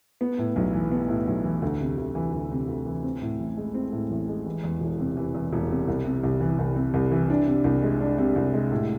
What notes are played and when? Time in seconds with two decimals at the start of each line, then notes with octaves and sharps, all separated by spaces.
0.21 B3
0.38 A2
0.56 B1
0.73 E3
0.91 B3
1.09 A2
1.27 B1
1.44 E3
1.62 D2
1.80 C3
1.97 D2
2.15 E3
2.33 D2
2.51 C3
2.68 D2
2.86 E3
3.04 C4
3.22 A2
3.39 A1
3.57 G#3
3.74 C4
3.92 A2
4.10 A1
4.28 G#3
4.46 E3
4.64 E2
4.81 E1
4.99 C3
5.17 E3
5.35 E2
5.53 E1
5.70 C3
5.88 C2
6.05 C3
6.24 C2
6.41 E3
6.59 C2
6.76 C3
6.94 C2
7.11 E3
7.30 D4
7.47 C3
7.64 C2
7.83 G#3
8.00 D4
8.18 C3
8.36 C2
8.54 G#3
8.72 A2